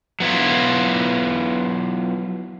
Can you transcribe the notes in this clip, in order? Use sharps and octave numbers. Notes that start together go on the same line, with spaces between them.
F#3 B3 E4 F4